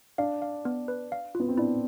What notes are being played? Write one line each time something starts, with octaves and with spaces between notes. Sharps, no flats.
D4 F5
F5
B3
B4
F5
B3 F4
C4
D4 E4